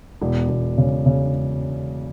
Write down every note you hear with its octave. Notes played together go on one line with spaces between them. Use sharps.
E1
E1
C#3
C#3